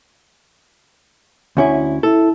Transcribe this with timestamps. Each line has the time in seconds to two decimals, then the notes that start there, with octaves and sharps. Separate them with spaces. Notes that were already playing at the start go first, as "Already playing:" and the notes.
1.57 D2 C#4 E4
2.03 E4 A4